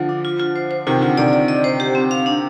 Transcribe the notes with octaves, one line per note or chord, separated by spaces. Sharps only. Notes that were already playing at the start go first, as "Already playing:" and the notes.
Already playing: D3 F3
D4
F4
F4
C5
C5
C3 D#3 F4
D3 F4
C3 D#3 D5
D5
D#5
C5
G4
C4
F5
D4